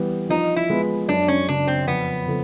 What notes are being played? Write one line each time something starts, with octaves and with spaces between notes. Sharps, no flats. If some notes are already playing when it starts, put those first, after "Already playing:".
Already playing: E3 G3 B3
F3 D#4
E4
G#3 B3
F#2 D4
C#4
C#3 F#3 D4
C4
F2 B3
C#3 F3 A3 C4